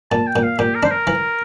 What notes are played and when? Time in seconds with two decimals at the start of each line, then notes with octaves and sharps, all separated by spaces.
0.11 A#2 A5
0.27 G5
0.36 A#2
0.43 F5
0.59 A#2 G4
0.75 A#4
0.83 D4 C5
0.91 A#4
1.07 E3